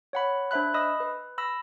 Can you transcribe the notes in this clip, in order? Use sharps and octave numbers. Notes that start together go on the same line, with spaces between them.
C#5 F#5 B5
D4 C5 E5 B5 F#6
D#5 B5 D#6 E6
B4
B5 E6 A#6